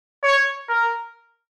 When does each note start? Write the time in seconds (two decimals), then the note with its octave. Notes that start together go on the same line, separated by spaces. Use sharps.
0.23 C#5
0.69 A#4